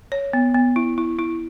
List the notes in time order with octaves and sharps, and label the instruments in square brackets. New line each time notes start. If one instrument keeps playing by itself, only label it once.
[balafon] C#5
B3
B3
E4
E4
E4